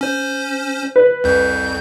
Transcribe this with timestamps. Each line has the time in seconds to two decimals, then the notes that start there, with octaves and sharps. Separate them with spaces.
0.01 C#4 C5
0.96 B4
1.24 C2 F2 G6